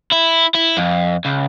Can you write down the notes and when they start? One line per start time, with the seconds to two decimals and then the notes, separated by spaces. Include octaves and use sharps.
0.12 E4
0.54 E4
0.77 F2
1.25 C#2